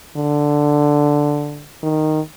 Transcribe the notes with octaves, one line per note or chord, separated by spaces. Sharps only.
D3
D#3